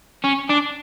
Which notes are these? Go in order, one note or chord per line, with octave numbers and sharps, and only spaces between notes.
C#4
D4